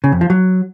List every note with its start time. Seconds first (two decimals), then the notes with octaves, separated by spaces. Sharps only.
0.04 C#3
0.12 F2
0.21 F3
0.30 F#3